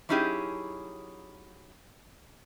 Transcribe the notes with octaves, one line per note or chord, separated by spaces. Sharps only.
F#3 C#4 D#4 E4 G4 G#4